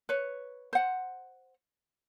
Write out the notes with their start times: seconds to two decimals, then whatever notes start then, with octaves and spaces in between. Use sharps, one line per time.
0.09 B4 C#5
0.73 C5 F#5